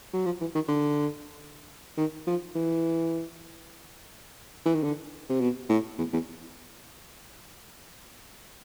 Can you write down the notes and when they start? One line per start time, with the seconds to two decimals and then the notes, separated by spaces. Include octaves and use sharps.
0.13 F#3
0.26 F3
0.41 E3
0.55 D#3
0.68 D3
1.97 D#3
2.27 F3
2.55 E3
4.66 E3
4.75 D#3
4.83 D3
5.30 C3
5.40 B2
5.69 A2
5.98 E2
6.13 E2